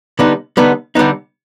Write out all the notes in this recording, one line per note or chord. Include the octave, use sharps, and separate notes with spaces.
D3 G3 B3 D#4
D3 G3 B3 D#4
D3 G3 B3 D#4